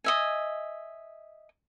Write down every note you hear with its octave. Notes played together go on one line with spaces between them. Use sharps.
D#5 E5 G#5